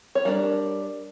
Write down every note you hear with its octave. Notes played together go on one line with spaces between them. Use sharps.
C#5
G3 D4 A#4